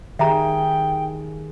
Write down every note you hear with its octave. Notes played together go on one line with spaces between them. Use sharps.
D#3 G4 G#4 E5 G5 A#5